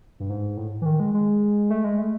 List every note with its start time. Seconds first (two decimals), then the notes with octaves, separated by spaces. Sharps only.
0.20 G2
0.29 G#2
0.57 A2
0.82 E3
0.86 D#3
1.00 G#3
1.14 G#3
1.70 A3
1.84 G#3
1.98 A3